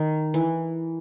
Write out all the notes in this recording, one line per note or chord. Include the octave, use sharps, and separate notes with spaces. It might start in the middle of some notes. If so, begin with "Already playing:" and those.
Already playing: D#3
E3